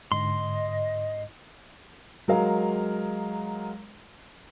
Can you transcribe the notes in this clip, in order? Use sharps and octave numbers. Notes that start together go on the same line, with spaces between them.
G#2 D3 D#5 C6
F#3 G#3 A#4 F5